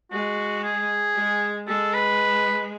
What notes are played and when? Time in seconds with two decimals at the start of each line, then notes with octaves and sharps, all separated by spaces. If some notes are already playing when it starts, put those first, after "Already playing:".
0.12 G#3 F#4
0.64 G#4
1.15 G#3
1.68 G#3 A4
1.94 B4